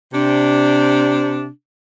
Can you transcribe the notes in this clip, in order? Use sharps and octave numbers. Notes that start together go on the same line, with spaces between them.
C3 D4